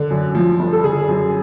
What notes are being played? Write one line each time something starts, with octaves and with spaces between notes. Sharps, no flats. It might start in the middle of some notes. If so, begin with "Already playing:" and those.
Already playing: D3
F#2
F3
G1
A4
D3 G#4
F#2